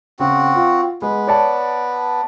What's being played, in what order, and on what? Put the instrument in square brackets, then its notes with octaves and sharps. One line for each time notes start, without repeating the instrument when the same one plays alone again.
[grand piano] C#3 [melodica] C4 F#4
[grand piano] F4
[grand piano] G#3 [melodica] B3
[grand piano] C#5 D5 A5